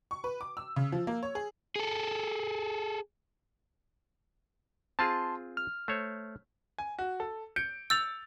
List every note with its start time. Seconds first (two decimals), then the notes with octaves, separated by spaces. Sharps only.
0.11 C#6
0.24 B4
0.41 D6
0.57 E6
0.76 C#3
0.92 F3
1.07 A#3
1.23 C#5
1.35 G#4
1.76 G#4 A4
4.99 C4 F4 G#4 A5 C6
5.57 F6
5.88 A3 C5 C#5
6.78 G#5
6.99 F#4
7.20 A4
7.56 G6 C#7 D7
7.90 E6 G6 A6 F7